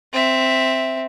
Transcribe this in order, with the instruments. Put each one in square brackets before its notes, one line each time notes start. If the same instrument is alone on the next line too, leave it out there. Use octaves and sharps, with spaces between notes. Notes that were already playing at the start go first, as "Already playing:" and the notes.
[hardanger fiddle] C4 E5